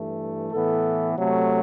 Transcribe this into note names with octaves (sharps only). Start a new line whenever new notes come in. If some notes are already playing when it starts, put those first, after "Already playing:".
Already playing: G2 E3 A3
A2 E3 B3 A4
C3 F#3 A3